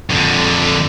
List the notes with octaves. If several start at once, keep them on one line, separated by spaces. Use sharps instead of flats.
F2 D3